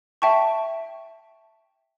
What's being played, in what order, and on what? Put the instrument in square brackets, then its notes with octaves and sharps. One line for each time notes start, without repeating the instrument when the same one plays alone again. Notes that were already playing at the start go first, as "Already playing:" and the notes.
[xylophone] E5 G5 A5 C#6